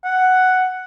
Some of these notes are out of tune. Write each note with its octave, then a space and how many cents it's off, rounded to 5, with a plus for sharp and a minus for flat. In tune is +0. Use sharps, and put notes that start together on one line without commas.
F#5 +5